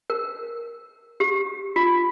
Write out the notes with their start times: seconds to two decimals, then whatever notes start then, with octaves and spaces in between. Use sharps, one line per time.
0.10 A#4
1.20 G4
1.76 F4